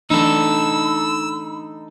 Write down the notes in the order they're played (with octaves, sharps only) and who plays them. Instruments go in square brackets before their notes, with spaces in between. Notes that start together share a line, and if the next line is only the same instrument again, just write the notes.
[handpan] E3 A3 D4 [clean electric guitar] D#4 A4 [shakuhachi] B5 [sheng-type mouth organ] E6